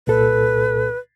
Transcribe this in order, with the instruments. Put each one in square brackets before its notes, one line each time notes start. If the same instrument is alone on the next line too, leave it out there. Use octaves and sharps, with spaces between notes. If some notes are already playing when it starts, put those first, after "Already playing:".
[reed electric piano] C2 A#2 A4 [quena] B4